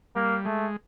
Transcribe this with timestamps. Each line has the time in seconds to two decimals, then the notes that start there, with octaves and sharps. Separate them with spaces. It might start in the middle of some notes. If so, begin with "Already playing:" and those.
0.16 G3 A#3
0.45 G#3 A3